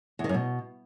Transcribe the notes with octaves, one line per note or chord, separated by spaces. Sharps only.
E2
D#3
F#2
B2